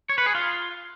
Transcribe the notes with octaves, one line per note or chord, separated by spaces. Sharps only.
C#5
B4
G#4
F4